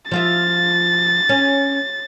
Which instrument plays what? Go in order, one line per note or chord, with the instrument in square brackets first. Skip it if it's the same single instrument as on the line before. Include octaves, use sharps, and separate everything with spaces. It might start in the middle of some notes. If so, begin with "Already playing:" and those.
[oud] F3 F4 E5 [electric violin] A6
[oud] C#4